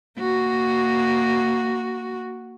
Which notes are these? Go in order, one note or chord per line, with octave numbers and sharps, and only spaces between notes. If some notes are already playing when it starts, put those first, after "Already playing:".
A#3 F#4